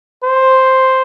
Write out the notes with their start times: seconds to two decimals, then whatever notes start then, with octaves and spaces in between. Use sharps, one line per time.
0.24 C5